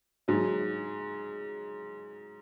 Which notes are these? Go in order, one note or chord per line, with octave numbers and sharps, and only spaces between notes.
G#2 F#3